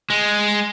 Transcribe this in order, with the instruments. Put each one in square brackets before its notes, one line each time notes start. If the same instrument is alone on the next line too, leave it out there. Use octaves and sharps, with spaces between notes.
[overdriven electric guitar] G#3